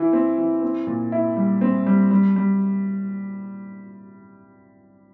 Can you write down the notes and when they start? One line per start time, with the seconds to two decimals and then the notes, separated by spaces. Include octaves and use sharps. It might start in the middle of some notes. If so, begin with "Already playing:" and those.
Already playing: E3 E4
0.13 C4
0.38 E3
0.62 C4
0.87 A#2
1.12 E4
1.37 G3
1.61 C4
1.87 G3
2.11 G3
2.36 G3